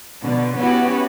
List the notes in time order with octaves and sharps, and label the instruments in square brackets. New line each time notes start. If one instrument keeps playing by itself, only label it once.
[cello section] B2 D3
B3 C#4 E4 F#4 G4